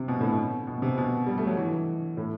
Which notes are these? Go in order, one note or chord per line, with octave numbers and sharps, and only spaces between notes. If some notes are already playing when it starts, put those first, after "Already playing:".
Already playing: C3
B2
A2
B2
B2
C3
B2
G3
A3
F#3
E3
A2